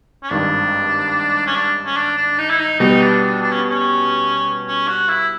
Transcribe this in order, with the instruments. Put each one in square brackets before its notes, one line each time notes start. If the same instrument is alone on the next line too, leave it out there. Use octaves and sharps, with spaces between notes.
[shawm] C#4
[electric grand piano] G#1 G2 D#3 [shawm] D4
[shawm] C#4
D4
C#4
D4
D4
D#4
E4
D#4
[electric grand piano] B2 G3 B3 [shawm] D#4
[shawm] D4
D4
D4
C#4
C#4
C#4
F#4
E4